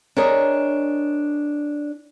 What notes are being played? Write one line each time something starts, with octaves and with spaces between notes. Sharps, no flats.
D4 G#4 A#4 C#5 D#5